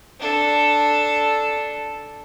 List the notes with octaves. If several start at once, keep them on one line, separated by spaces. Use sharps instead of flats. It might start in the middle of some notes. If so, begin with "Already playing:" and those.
D4 A4